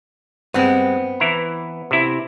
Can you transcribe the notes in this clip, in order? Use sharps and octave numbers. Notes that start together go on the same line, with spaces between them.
G2 G#3 B3 C4
E3 E4 A#5
C3 E4